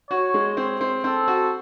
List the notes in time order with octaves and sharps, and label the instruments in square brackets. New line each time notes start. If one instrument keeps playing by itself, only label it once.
[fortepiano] F#4 [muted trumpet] C#5
[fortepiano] G#3
C4
C4
[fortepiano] C4 [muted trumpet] A4
[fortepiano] F#4